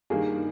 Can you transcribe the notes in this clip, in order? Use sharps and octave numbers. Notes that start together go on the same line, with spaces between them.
G2 D#3 A#3 G#4